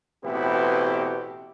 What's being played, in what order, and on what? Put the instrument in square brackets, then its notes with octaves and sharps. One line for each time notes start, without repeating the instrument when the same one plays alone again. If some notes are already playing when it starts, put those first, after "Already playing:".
[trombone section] A1 B2 C4 E4 G4 B4